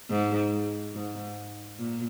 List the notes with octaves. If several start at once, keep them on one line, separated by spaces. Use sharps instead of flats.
G#2
G#2
A#2